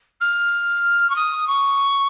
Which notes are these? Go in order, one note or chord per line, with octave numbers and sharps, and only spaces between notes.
F6
C#6
D#6
C#6